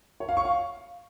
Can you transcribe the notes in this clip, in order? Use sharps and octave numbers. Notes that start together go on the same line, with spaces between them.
C#5
F5
C#6
F5